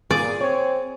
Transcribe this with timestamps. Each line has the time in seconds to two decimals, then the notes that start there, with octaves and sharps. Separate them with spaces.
0.11 A#2 G#4 D5
0.41 C4 C#5